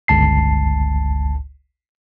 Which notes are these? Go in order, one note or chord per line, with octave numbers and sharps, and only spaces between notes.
G1 C#2 A5 C7